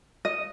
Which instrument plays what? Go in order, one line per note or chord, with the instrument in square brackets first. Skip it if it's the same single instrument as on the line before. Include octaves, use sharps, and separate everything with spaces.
[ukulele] D#5